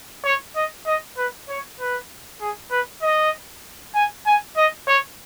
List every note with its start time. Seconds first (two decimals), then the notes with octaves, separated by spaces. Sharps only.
0.25 C#5
0.56 D#5
0.87 D#5
1.18 B4
1.49 C#5
1.80 B4
2.41 G#4
2.71 B4
3.03 D#5
3.95 G#5
4.26 G#5
4.57 D#5
4.88 C#5